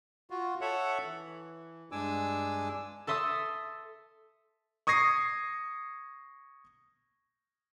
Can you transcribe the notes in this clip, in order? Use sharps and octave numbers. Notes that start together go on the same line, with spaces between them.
F4 F#4
A4 C#5 E5 F#5
E3
G2 G#3 D4 G#5 D6 E6
A4 E5 C6 D#6 E6
C#6 D#6 G#6 A#6 C7